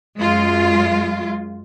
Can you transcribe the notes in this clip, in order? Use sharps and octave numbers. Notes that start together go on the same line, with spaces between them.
F#2 G#3 F4